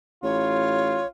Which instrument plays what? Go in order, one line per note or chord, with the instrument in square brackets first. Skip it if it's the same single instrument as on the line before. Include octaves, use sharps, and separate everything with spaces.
[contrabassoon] A1 [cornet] F4 [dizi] C#5